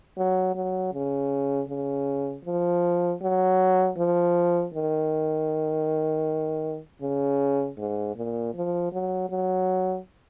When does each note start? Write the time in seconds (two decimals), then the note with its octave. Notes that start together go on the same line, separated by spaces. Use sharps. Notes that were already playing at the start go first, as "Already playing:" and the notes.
0.18 F#3
0.55 F#3
0.94 C#3
1.69 C#3
2.45 F3
3.22 F#3
3.98 F3
4.74 D#3
7.02 C#3
7.78 G#2
8.16 A#2
8.55 F3
8.93 F#3
9.30 F#3